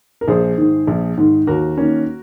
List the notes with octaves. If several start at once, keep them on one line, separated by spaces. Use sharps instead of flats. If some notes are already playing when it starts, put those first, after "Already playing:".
A#4
A#1 G#4 C5
G#2 D#3
A#1
G#2 D#3
D#2 F#4 A#4
D#3 A#3 C#4